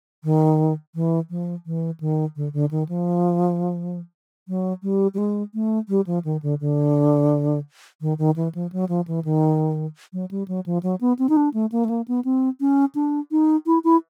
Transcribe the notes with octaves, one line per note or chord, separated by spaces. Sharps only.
D#3
E3
F3
E3
D#3
D3
D3
D#3
F3
F#3
G3
G3
G#3
A3
G3
F3
D#3
D3
D3
D#3
D#3
E3
F3
F#3
F3
E3
D#3
F#3
G3
F#3
F3
F#3
B3
C4
D#4
D4
A3
A#3
A3
A#3
B3
C4
C#4
D4
D#4
E4
E4